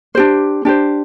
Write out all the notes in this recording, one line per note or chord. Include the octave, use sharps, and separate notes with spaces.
D4 G4 C5
D4 G4 C5